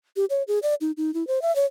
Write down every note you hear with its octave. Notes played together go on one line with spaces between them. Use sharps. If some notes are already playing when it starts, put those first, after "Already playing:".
G4
C#5
G#4
D5
D#4
D#4
E4
C5
E5
C#5